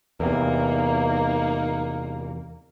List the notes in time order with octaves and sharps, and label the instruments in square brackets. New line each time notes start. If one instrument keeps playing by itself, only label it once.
[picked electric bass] E2 C3 [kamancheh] A#3 D#4